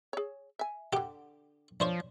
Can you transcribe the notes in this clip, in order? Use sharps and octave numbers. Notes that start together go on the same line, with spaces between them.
G#4 C#5
E5 G#5
D3 G4 F#5 D6
F3 D4 C5 C#5